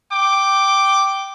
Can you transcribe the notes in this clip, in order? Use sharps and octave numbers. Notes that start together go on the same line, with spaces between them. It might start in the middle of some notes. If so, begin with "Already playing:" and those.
G5 D6